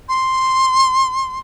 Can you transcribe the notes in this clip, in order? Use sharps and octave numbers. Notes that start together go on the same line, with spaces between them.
C6